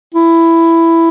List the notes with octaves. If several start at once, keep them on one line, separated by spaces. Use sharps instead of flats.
E4